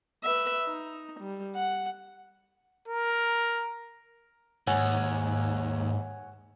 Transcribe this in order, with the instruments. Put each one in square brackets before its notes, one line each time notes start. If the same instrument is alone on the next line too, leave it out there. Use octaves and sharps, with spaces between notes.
[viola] B4 E5
D#4
G3
F#5
[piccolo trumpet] A#4
[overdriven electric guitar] D#2 [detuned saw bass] G#2 [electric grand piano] C#5 F#5 G#5